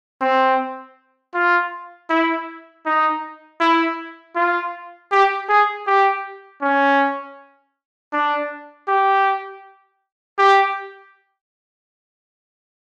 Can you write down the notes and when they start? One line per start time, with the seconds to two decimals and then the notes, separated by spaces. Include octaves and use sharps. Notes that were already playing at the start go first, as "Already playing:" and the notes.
0.21 C4
1.34 F4
2.10 E4
2.86 D#4
3.60 E4
4.35 F4
5.12 G4
5.49 G#4
5.87 G4
6.62 C#4
8.12 D4
8.88 G4
10.38 G4